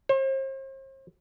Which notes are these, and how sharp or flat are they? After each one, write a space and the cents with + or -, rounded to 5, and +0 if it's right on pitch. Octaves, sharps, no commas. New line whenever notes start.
C5 +40